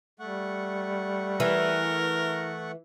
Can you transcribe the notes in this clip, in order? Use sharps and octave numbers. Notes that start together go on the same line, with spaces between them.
G3 A3 F#5 C#6
E3 A#4